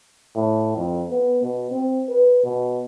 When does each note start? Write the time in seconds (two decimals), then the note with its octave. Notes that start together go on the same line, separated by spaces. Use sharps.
0.35 A2
0.77 F2
1.10 B3
1.43 B2
1.71 C4
2.09 B4
2.44 B2